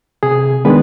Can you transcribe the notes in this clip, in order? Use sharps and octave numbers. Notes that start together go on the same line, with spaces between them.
C3 G#4
D#3 G#3 B3 D4 B4